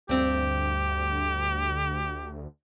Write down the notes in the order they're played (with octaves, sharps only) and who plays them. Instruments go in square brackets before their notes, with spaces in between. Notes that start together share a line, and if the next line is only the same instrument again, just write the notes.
[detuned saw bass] D2 [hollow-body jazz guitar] G2 C4 [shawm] G4